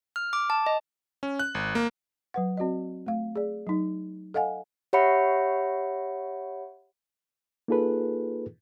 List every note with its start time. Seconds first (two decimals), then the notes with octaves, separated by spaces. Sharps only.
0.16 F6
0.33 D6
0.50 A5
0.66 D#5
1.23 C#4
1.39 F#6
1.55 G#1
1.75 A#3
2.34 F#3 B4 F#5
2.57 C4 F#4 D5 D#5
3.06 A3 F5
3.36 G#4 D5
3.67 F#3 D#4
4.34 A4 D#5 F5 F#5 G#5
4.93 G4 C#5 E5 F#5 B5 C#7
7.68 A#3 D#4 F4 G#4 A4 B4